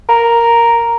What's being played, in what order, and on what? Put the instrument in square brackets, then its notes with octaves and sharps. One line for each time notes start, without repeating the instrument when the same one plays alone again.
[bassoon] A#4